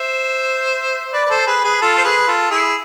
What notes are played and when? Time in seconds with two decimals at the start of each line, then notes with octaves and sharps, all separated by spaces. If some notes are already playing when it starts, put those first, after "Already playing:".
Already playing: C5 E5
1.13 B4 D5
1.25 B4
1.30 A4 C5
1.47 G#4 B4
1.64 G#4 B4
1.82 F4 A4
1.98 C5
2.04 G#4 B4
2.28 F4 A4
2.51 E4 G#4